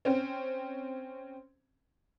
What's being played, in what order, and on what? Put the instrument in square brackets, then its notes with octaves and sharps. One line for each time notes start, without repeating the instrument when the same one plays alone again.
[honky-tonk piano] C4 C#4